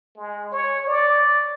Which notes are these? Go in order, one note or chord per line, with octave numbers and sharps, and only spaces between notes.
G#3
C#5
D5